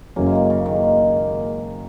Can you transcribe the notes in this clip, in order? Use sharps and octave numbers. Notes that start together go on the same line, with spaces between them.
F#1 F#2 F#3 A#3 C#4
G#3
A#3
C#3
D#3
G#3